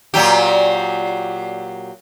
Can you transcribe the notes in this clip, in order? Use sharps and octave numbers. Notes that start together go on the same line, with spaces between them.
A#2 F#3 G4